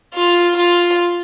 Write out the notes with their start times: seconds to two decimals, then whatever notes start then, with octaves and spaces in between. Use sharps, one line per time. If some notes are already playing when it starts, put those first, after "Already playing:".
0.14 F4
0.56 F4